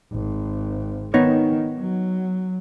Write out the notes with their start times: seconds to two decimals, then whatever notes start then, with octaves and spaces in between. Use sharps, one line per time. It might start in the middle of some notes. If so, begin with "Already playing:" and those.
0.12 G#1
1.14 D#3 B3 D#4 C#5
1.77 F#3